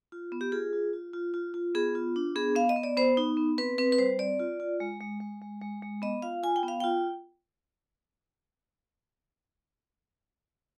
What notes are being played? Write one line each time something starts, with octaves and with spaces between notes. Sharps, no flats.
F4
B3
G4
F4 G#4
F4
F4
F4
F4
F4
B3 G#4
F4
D4
B3 G#4
B3 F5
D#5
B3
D5
B3 C5
D#4
B3
C4 B4
C4 B4
B4
G3 C5
C4 D5
F4
F4
G#3
G#3
G#3
G#3
G#3
G#3
B3 D#5
F4 F5
F4 G#5
G5
B3 F5
F4 G5